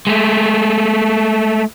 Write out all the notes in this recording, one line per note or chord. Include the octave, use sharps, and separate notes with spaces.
G#3 A3